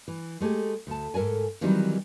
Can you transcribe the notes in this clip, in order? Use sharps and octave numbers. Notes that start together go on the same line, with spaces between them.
E3
G#3 A3 G4 G#4
D2 A5
G#2 A4 A#4 D5 G#5
D#3 E3 F#3 G3 C4 D#4